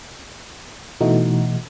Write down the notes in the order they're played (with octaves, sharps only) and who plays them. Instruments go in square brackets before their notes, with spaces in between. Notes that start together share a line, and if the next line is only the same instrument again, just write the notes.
[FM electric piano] B2 E3 A3 D#4 F#4